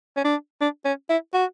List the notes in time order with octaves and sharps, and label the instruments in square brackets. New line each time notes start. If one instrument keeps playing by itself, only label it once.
[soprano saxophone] C#4
D4
D4
C#4
E4
F#4